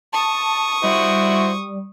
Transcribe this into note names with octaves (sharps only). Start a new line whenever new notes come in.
A5 C#6 D#6
G3 E4 F#4 C5